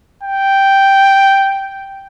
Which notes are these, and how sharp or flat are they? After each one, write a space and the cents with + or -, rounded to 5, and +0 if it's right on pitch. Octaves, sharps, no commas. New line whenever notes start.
G5 -5